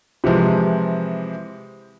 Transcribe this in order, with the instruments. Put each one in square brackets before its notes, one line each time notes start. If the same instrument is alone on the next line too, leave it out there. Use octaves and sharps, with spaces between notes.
[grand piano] C3 E3 F3 G#3